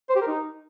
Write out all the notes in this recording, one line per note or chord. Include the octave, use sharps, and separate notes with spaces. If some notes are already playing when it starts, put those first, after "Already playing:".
C5
G4
A#4
D#4